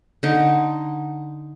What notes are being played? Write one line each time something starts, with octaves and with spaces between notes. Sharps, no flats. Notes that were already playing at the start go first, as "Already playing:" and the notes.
D3 D#4